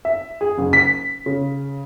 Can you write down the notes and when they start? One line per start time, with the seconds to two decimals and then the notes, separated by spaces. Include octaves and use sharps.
0.05 E5
0.41 G#4
0.58 F#1
0.73 B6
1.26 C#3